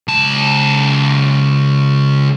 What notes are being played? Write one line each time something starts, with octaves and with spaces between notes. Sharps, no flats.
C#2 A5